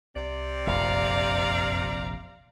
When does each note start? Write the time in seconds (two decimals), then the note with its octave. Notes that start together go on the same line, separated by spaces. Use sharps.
0.16 C2 C3 D5
0.67 F1 A#1 F#2 F5 A#5